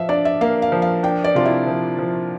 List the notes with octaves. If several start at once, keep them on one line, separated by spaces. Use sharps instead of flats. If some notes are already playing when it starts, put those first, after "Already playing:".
Already playing: F3 E5 F5
D4 D5
E5
A#3 F5
F5
F3
F5
D4 G5
D5
C3 F4
E4
F3
F3